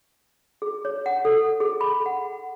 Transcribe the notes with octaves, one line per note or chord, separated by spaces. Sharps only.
G#4
C#5
F#5
A4
G#4
B5
F#5